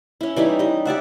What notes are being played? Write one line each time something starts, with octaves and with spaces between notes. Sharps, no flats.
C#4 E4
E3 G3 D#4 E4
G3 D#5
G4 D5 E5 F#5